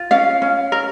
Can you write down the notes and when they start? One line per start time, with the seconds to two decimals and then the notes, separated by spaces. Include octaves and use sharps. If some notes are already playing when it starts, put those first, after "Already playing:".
Already playing: F4
0.11 C#4 F5
0.42 C#4
0.72 A#4